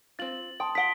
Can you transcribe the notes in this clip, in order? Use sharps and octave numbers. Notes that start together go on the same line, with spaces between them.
C4 F4 A6 F#7
G5 A5 C6 D#6
F4 F#5 B6 D7 G7